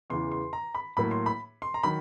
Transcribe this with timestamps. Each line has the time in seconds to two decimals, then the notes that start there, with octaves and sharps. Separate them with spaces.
0.10 E2 C#3 E3 C6
0.32 C6
0.53 A#5
0.75 B5
0.97 A2 F#3 A#3 B5
1.11 C6
1.26 B5
1.62 C6
1.74 A#5
1.83 D#3 F#3 B5